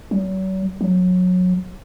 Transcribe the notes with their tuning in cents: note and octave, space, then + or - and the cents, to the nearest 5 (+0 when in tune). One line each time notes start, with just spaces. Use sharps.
F#3 +40
F#3 -25